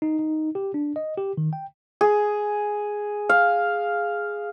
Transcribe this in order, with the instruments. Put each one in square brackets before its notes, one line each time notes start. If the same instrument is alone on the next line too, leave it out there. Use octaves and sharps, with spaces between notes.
[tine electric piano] D#4
D#4
G4
D4
D#5
G4
D#3
G5
[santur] G#4
F5